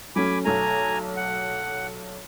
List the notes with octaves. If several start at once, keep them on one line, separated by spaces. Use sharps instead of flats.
F#3 A3 C#4 G#5 B5 D6
B1 A3 G#5 A#5
F#5